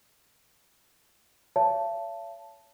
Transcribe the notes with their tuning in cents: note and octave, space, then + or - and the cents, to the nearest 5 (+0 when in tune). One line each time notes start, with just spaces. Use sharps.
C#5 +30 E5 +45 A5 +0